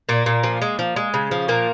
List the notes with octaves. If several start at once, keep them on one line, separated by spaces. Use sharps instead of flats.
A#2 A#3
A#2
F3
G#3
F3
G#3
C#3
F3
A#2 A#3 A#4